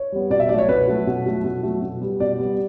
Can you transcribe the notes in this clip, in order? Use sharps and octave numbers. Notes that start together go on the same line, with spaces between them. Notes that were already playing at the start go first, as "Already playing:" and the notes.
Already playing: C#5
G3 B3
B2 D5
E5
F#3 A3 D5
C#5
B2 B4
F#3 A3
B2
F#3 A3
B2
F#3 A3
B2
G3 B3
B2 D5
G3 B3